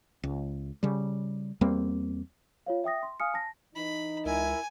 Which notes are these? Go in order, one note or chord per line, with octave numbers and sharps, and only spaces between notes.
C#2
C#3 G3
E2 G3 A#3 C4
F4 C#5 F5
E5 G5 D#6 A#6
C6
F5 G#5 D#6 F6 C#7
A5 A#6
E3 D#4 B5
C#2 E4 A#4 E5 G#5